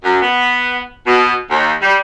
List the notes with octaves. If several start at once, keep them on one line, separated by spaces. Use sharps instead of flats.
F#2
B3
B2
D#2
G3